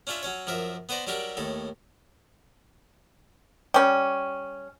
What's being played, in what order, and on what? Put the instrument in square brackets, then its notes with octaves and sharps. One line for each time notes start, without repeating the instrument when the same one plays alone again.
[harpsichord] C#4 D4 F4 C#5 E5
F#3 C#4 C#5
F#2 F3 A#4 E5
B3 B4 C5 D5 A#5
F#3 G3 D4 G4 A#4
D#2 A2 A4
[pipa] G3 C#4